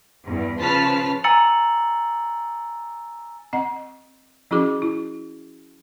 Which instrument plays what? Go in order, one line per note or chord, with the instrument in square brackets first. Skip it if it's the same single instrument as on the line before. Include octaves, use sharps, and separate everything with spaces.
[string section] E2 G2
C#3 F3 B4 A5 F6 B6
[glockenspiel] G#5 A#5 E6 A6 C#7 F#7
[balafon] C4 D#5 F#5
F3 C#4 E4 F#4 G#4 D6
E4